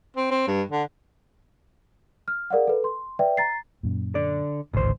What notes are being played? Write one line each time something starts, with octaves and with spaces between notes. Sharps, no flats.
C4
C4
G2
D3
F6
G#4 A#4 D5 F5 F#5
A4 B4
C6
B4 D5 E5 G5
A#5 A6 C7
F#2 A#2
D3 D5
D1 G#1 C#2 C5